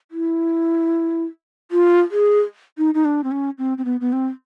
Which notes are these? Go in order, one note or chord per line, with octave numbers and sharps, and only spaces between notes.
E4
F4
G#4
D#4
D#4
D4
C4
C#4
C4
C4
B3
B3
C4